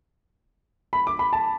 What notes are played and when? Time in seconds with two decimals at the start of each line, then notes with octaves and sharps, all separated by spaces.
0.93 B5
1.07 D6
1.19 B5
1.33 A5